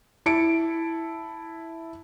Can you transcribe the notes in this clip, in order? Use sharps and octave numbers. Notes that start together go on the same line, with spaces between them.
E4 A5 C#7 D7